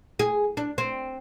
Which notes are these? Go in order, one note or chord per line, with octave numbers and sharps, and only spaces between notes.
G#4
D4
C4